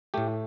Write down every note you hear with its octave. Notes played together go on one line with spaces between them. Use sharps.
A2 A3 G4